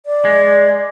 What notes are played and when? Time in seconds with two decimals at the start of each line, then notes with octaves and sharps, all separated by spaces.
0.06 D5
0.25 G#3